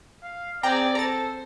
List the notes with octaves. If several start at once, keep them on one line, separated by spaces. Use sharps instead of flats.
F5
C4 G#4 D5 G5 A#5
A4 C5 A#5 A6